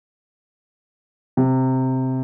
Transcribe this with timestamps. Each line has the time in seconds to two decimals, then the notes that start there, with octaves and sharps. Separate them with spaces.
1.37 C3